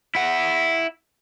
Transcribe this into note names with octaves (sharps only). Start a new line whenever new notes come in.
E4 F#5